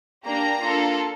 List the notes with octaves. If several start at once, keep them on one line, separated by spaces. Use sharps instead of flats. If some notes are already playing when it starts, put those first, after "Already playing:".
A#3 D4 G4 A#5
A#3 D4 F4 A4